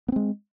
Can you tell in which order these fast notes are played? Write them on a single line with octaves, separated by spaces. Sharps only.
B3 C4 G#3